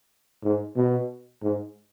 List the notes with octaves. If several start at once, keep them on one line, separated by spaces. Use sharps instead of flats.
G#2
B2
G#2